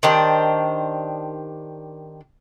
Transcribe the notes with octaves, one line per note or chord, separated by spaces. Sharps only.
D#3 D4 G4 C5